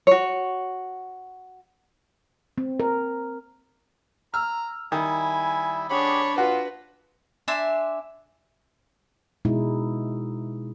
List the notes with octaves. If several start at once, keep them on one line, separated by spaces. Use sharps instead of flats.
F#4 C#5
C4
A#4
A#5 E6 F6
D#3 G3 E4 E5 G#5
D4 G4 G#4 C#5 F#5 B5
A#2 F4 F#4 B4
D4 E5 G#5 C6
B2 G#3 D#4 E4